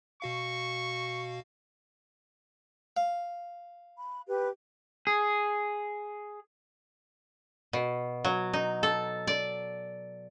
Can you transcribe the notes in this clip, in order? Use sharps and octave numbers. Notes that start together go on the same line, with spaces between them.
B2 F#4 F5 C#6
F5
B5
G4 B4
G#4
B2
F#3
D#4
A4
D5